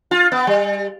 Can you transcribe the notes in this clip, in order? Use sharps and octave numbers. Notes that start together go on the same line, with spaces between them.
F4
B3
G3